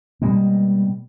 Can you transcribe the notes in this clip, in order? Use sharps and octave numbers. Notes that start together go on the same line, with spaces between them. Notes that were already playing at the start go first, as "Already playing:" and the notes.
B2 G3 G#3 A#3